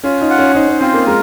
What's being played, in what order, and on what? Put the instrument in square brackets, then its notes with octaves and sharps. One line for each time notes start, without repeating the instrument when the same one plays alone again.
[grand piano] C#4 [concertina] F4
[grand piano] D#4
[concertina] F#5
[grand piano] C#4
[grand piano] D#4 [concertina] C5
[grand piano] C#4
[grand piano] C4 [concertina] F4
[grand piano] A#3
[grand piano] G#3 [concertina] A#4